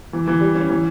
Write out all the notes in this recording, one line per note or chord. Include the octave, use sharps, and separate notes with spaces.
E3
E3
G3
C#4
E3